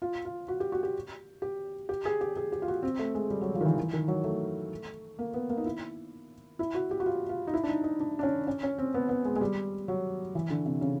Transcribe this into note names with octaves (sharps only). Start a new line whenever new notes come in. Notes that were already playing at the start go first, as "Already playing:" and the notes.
F4
F4
F#4
G4
F#4
G4
G4
G4
G#4
G4
G#4
G4
F4
F#4
C4
A3
G#3
G3
F#3
F3
D#3
E3
E3
D#3
F#3
A3
A#3
B3
A#3
D#4
E4
E4
F#4
G4
F#4
F4
F4
D#4
E4
D4
D#4
D#4
D4
D4
C#4
C#4
C#4
C4
B3
B3
G#3
G#3
G3
F#3
E3
D3
C3
C#3